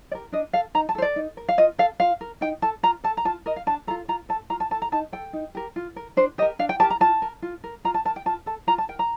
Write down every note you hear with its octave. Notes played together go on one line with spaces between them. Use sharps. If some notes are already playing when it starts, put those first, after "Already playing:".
G4 A#4 D5
D4 D#5
A4 F5
D#4 A#5
A5
A4 C5
D5
D#4
A#4
F5
F4 D#5
A4 F5
F4 F5
A#4
D#4 G5
A4 A5
F4 A#5
A4 A5
A#5
F4 A5
A#4 D#5
F5
D4 A5
F4 A4 A#5
F4 A#5
A4 A5
F4 A#5
A5
A4 A5
A#5
D#4 A5
A4 G5
D#4
G4 A#4
F4
A#4
D4 C5
G4 A#4 D#5
D4 F5
G5
G4 A#4 A5
A#5
F4 A5
A#4
F4
A#4
F4 A#5
A5
A#4 A5
G5
F4 A5
A4 A5
F4 A#5
A5
A#4 G5
A#5